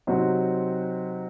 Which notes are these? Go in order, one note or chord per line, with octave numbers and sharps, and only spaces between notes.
C3 F#3 C4 D#4 F#4